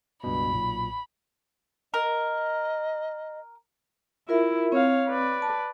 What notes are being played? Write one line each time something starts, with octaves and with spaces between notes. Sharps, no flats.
C#2 G2 B2 B5
B1 A#2
A#4 D#5
E4 F4 A#4 E5
C4 C#5 F5
B4 D5
A5